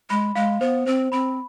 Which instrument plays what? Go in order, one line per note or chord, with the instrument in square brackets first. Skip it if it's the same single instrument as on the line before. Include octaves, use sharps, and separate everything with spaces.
[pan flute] G#3 [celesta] B5
[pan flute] G#3 [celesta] F5
[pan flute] B3 [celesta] C5
[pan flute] C4 [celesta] C5
[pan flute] C4 [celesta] B5